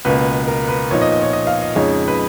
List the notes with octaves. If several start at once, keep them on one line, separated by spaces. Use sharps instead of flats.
C#2 B2 A#3 B4
A#4
B4
A#2 F3 B3 D#4 C#5
D#5
D#5
C#5
D#5
F5
D#5
F2 C#3 G#3 D#4 C#5
B4